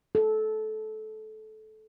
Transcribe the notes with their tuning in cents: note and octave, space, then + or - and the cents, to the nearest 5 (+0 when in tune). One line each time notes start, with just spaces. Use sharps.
A4 -20